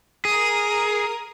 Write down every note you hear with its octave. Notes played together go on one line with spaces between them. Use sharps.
G#4 A#4 D#6